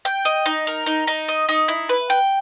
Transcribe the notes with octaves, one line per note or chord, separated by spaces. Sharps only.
G5
D#5
D#4
A#4
D#4
D#4
D#5
D#4
E4
B4
G5